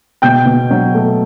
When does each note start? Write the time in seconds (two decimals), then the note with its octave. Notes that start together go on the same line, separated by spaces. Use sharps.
0.22 B2 G5 G6
0.46 B2
0.70 F#3
0.94 A3